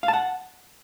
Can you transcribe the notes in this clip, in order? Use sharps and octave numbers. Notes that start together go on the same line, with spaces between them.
F5
A5
F#5